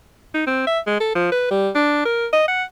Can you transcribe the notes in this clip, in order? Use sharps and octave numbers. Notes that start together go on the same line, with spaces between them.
D#4
C4
E5
G#3
A4
F3
B4
G3
D4
A#4
D#5
F#5